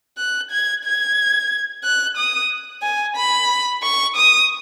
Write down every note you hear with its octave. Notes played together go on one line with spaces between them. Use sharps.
F#6
G#6
G#6
F#6
D#6
G#5
B5
C#6
D#6